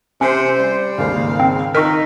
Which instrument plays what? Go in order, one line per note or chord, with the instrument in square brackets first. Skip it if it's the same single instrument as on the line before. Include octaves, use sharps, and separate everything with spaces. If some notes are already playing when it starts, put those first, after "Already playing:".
[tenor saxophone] C3 [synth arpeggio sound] C#4 [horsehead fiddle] C5
[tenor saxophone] G3
[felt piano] G#1 D#2 C#3 [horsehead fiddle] F5
[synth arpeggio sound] C4
[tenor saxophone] D#3 [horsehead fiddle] D#4 [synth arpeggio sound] A#4 C#6 [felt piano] E6 B6